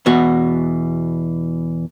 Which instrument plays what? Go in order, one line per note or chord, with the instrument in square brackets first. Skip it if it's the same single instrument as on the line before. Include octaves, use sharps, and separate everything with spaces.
[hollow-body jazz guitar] E2 B2 F#4